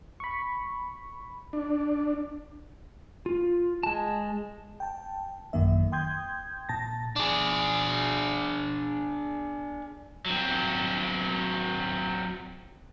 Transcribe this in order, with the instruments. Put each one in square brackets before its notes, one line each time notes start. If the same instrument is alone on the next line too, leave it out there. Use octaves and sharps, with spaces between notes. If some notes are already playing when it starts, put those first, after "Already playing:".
[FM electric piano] B5 C#6
[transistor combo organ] D4
[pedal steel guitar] F4
G#3 A5
[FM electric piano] G5 A5
A1 F#2 D#3 A#3 E5
G5 C6 D#6 G6 G#6
A#2 A5 A6 A#6
[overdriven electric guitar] D4 G#4
F#3 C4